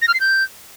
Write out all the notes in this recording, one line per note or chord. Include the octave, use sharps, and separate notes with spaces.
A#6
F6
C7
G6